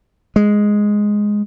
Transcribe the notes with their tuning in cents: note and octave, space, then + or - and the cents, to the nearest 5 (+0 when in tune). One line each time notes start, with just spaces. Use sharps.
G#3 +0